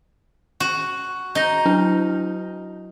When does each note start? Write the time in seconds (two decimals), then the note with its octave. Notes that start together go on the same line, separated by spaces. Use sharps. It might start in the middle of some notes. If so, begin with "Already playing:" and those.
0.60 F#4
1.35 D#4 G6 A#6
1.66 F#3 D4 E4